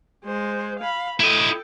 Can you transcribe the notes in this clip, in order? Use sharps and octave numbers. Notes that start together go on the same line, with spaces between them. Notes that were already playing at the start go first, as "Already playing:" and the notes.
G#3 C5
F5 B5
E4 A4 D#5 G5